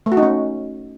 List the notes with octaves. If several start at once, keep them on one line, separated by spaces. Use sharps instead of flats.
A3
F#4
D#4
C#4